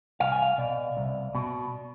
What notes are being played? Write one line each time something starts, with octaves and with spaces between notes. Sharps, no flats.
C2 F5
G#5
F5
B2 D5
C2
B2